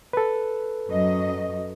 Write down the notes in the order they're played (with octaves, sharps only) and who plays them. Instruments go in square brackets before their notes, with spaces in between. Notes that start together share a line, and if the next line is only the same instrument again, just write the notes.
[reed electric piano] A4 B4
[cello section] F#2 F#3 D#5